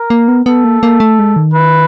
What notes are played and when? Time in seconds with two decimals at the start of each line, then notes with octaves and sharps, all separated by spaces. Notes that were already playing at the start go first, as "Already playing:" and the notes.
Already playing: A#4
0.10 A#3
0.28 B3
0.46 B3 A4
0.64 A#3
0.83 A#3
1.00 A3
1.19 G#3
1.36 D#3
1.54 B4